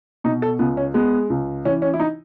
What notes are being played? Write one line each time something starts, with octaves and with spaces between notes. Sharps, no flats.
B2 D#4
A4
C#2 B3
C#4
G#3 B3
C#2
E3 C#4
C#4
E4
D#4